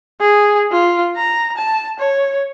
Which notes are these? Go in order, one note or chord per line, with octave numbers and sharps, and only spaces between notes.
G#4
F4
A#5
A5
C#5